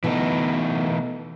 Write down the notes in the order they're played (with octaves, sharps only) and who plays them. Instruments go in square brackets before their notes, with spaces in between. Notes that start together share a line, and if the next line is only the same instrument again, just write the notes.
[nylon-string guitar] B2 [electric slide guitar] E3 A3 D#4